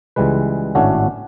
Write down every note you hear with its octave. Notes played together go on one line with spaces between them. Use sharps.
C#2 E3 G3 G#3 B4
G#1 A2 A3 C#4 D4 F#4